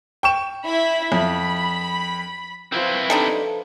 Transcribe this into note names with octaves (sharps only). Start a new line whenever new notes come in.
G5 C#6 E7
E4 E5 B5
F2 B5
F3 C4 E4 B4
G3 D4 D#4 A4